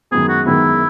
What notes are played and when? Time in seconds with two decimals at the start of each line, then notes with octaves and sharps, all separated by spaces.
0.12 F#2 D#3 G#3 B3 G#4
0.29 F#4
0.46 F#2 D#3 G#3 B3 E4